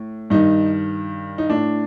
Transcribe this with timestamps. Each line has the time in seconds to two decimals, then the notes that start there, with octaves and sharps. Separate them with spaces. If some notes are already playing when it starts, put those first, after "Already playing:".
Already playing: A2
0.30 G2 D#3 D#4
1.38 D#4
1.50 A2 D4